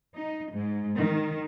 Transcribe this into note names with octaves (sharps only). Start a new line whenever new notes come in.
D#4
G#2
D#3